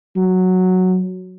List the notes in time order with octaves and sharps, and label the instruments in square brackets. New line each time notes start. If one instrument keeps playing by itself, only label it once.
[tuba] F#3